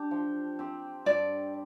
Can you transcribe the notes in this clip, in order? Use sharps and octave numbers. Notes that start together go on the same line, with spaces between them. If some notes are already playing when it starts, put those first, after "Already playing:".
Already playing: D4 G4
F3
C4 G4
G2 D5